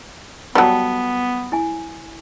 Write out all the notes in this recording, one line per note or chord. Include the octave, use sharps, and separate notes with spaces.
F#3 G3 B3 A4 G5 A5
E4 G#5